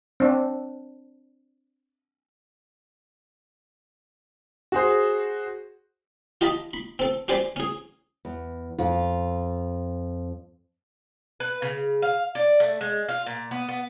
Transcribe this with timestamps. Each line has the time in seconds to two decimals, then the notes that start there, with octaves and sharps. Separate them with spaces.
0.20 C4 D4
4.72 F#4 G#4 C5
6.41 F4 G4 D#5 A5 B5
6.73 B5
6.99 C4 A4
7.28 C#4 G4 C5 D5 G#5 B5
7.56 C#4 G#4
8.25 E2
8.79 F2 F4
11.40 B4
11.62 C#3
12.02 F5
12.35 D5
12.60 A3
12.81 G#3
13.09 F4
13.26 A#2
13.51 B3
13.69 B3